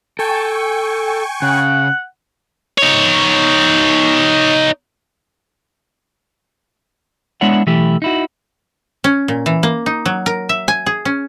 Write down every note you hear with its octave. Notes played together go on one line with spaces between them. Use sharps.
A4 G5 G#5 C#6
C#3 F#5
D#4 C#5
G#3 B3 D4 E4 C#5 F#5
B1 E3 A3 E4 G4
D#4 E4 F#4
C#4
A#2
E3
A#3
D#4
F#3
A#4
E5
G#5
G#4
C#4